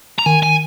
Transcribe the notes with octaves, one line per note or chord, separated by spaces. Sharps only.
A#5
D#3 G#5
G#5